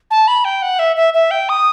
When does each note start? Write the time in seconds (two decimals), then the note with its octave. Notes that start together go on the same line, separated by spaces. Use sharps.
0.11 A5
0.28 B5
0.45 G5
0.62 F#5
0.79 E5
0.96 E5
1.14 E5
1.31 G5
1.49 D#6